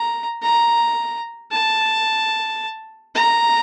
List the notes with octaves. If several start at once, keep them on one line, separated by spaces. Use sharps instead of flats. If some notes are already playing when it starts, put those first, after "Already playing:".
Already playing: A#5
A#5
A5
A#5